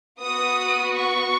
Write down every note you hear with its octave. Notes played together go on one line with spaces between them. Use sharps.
B3 F#4 D#6
C#6